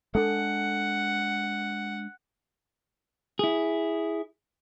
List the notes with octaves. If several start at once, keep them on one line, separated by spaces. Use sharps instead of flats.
G#3 D4 A4 F#5
E4 G#4